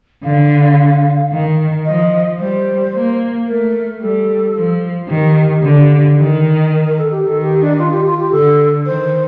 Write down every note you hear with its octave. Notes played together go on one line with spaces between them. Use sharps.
D3 F5
D#3
F3 D#5
G3 C5
A#3
A3 A#4
G3 A4
F3
D#3 G4
D3
D#3
A#4
A#4
A4
G4
D#3 A4
G4
D4
F4
G4
F4
G4
D3 A4
D#3 C5